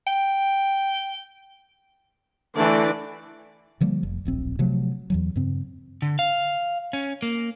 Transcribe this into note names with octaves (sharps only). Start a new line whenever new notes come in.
G5
D3 E3 A3 D5
D3 F3 G3 A#3
F1
D1 A#1 C4
C3 F3 F#3 A3
E2 E3 F#3
G2 C#3 C4
D3
F5
C#4
A#3